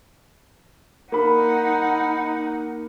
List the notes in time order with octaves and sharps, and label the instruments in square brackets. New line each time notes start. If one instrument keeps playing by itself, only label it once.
[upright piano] A#3 B5 [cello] D#4 F#5